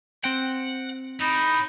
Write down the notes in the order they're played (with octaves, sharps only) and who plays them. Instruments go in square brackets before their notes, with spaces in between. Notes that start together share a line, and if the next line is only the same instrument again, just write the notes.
[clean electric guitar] C4 G5 [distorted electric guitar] F#5
[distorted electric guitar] A2 [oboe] D#4 [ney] B5